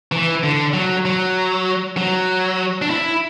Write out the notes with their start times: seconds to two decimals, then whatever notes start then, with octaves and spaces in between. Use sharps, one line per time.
0.12 E3
0.43 D3
0.74 F#3
1.05 F#3
1.97 F#3
2.82 D4
2.90 E4